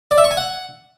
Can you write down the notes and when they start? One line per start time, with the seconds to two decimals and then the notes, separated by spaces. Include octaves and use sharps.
0.11 D5
0.18 E5
0.24 C#6
0.31 G#5
0.37 F#5